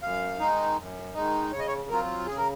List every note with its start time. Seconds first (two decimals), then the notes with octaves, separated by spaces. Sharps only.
0.02 F#2 F5
0.39 D#3 G#3 D#4
0.77 F#2
1.14 D#3 G#3 D#4
1.52 C#3 C#5
1.59 D#5
1.67 C#5
1.89 F#3 C4 F4 A#4
2.27 C#3 G#4
2.37 A#4